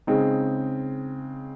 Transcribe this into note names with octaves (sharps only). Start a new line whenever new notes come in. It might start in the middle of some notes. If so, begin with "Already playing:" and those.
C#3 G#3 C4 D#4